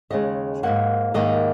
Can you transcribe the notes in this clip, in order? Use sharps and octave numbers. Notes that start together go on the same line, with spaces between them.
D#2 C#3 G#3 D#5
G#2 D#3 A#3 F#5
G#2 D#3 A#3 D#5